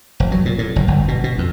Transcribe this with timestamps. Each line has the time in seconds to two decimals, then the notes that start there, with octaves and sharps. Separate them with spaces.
0.20 F1
0.32 F#3
0.45 A#2
0.59 A2
0.76 F#1
0.88 G1
1.08 B2
1.24 B2
1.38 F2